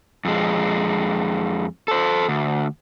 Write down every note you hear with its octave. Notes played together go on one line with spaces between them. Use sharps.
F2 G#3
A4 C5
D2